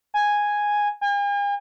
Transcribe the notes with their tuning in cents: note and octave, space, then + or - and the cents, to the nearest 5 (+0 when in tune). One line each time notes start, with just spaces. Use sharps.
G#5 -5
G#5 -45